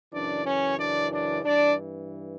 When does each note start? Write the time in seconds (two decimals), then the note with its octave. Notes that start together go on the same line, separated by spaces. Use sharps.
0.12 F#2 C#3 E3 D4 D5
0.45 C#4 C#5
0.78 D4 D5
1.12 D4 D5
1.44 G2 E3 D4 D5